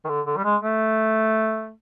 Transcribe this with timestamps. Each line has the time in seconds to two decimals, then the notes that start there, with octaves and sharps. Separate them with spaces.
0.05 D#3
0.09 D3
0.26 D3
0.37 G3
0.44 G#3
0.62 A3